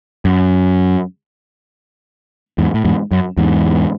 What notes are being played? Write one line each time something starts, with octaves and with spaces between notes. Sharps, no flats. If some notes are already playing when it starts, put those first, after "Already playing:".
F#2
E2 G#2
A2
E2 G#2
F#2
E2 G#2